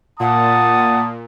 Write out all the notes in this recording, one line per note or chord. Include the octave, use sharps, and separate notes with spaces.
A#2 F#5 A5 D#6